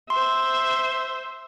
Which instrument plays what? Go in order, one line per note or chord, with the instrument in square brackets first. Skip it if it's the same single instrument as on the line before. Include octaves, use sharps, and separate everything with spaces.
[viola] C5 E5 [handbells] C6